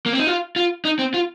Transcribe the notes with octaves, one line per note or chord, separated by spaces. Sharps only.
A#3
C4
D#4
F4
F4
D#4
C4
F4